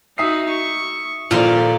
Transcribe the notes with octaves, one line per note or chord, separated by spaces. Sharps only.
D#4 F#4 E5 D#6 C7
C#6
D#1 A#2 F3 F4 A4 D5